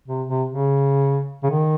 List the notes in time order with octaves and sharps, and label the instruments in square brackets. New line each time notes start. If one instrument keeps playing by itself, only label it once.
[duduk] C3
C3
C#3
C#3
D#3